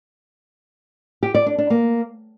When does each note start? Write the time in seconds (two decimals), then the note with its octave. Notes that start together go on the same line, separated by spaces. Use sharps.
1.23 G4
1.34 D5
1.46 D4
1.58 D4
1.70 A#3